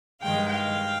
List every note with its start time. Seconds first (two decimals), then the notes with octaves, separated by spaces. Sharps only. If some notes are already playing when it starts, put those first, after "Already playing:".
0.21 G2 D#3 G#3 F5 G5
0.50 F5 G5